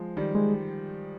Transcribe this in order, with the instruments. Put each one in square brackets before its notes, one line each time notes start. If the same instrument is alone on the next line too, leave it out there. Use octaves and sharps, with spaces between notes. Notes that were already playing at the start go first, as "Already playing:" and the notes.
Already playing: [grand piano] F3 G#3
D#3 G3
[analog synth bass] G#3